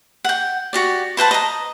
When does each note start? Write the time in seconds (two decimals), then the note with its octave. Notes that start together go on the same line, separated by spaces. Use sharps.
0.24 F#5 G5
0.73 F#4 G4 D5
1.17 B4 C5 F#5 A5
1.31 D#5 A#5